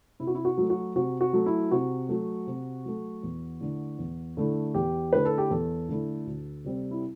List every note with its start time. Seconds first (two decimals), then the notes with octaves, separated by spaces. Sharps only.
0.20 C3 E4
0.27 F#4
0.35 E4
0.45 F#4
0.58 F#3 A3
0.70 F#4
0.96 C3 F#4
1.21 F#4
1.33 F#3 A3
1.46 E4
1.71 C3 F#4
2.09 F#3 A3
2.47 C3
2.85 F#3 A3
3.23 E2
3.61 D3 A3 E4
3.99 E2
4.37 D3 A3 E4
4.74 E2 G4
5.13 D3 A3 E4 B4
5.25 A4
5.38 G4
5.50 E2 A4
5.89 D3 A3 E4
6.26 D2
6.64 C3 G3 C4
6.91 E4